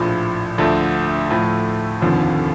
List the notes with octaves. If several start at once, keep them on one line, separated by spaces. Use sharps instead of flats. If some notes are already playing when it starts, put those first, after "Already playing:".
Already playing: A#1 A2 F3
D2 D3 F3 A3
A2 F3 A3
F1 D#2 D3 F3